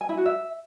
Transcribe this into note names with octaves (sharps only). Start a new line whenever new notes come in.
G#5
E4
F#4
E5